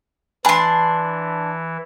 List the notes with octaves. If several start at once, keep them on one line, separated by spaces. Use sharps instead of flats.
E3 D4 G#5 B5 C6